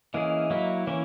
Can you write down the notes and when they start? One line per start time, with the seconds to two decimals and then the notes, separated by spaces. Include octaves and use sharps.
0.14 E3 A#3 C#4 G#4 D#5
0.22 E5
0.30 D#5
0.50 F#3 A#3 E4
0.87 E3 A#3 C#4 C#5